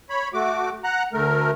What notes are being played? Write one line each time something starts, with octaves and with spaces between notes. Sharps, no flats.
C#5 B5
A3 F#4 D6
F#5 A#5 F#6
D2 A3 A#4